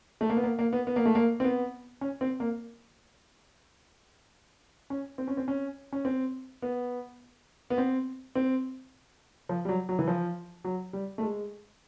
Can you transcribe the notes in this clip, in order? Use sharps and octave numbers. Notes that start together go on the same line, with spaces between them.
A3
A#3
B3
A#3
A#3
B3
B3
A#3
A3
A#3
C4
B3
C#4
C4
A#3
C#4
C4
C#4
C4
C#4
C#4
C4
B3
B3
C4
C4
F3
G3
F#3
F#3
E3
F3
F#3
G3
A3
G#3